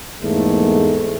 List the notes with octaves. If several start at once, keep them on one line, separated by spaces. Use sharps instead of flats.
E2 G#2 A3 A#3